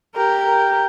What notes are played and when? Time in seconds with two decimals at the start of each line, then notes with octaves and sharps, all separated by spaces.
0.15 G4 A#4
0.46 A#4